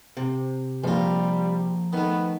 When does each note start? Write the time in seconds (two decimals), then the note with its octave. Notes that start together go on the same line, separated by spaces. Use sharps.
0.17 C3
0.84 A#1 F3 G3 F4 A#5
1.93 D#3 A3 B3